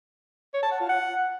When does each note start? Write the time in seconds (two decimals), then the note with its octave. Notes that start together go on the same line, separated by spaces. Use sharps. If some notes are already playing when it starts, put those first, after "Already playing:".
0.54 C#5
0.63 A5
0.72 F#5
0.80 F4
0.89 F#5